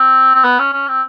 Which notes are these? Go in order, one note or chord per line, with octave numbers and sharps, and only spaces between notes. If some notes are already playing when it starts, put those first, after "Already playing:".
Already playing: C4
C4
B3
C#4
C#4
C4